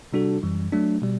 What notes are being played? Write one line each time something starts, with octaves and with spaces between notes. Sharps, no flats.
C3 G3 D4 F#4 A4
F#2 E3 G3
F#3 A3 D4
B2 G3